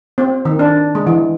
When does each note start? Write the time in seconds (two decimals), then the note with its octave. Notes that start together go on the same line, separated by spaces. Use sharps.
0.18 C4
0.45 D#3
0.59 D4
0.95 G#3
1.07 E3